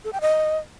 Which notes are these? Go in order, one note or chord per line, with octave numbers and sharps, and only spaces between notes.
A4
G5
D#5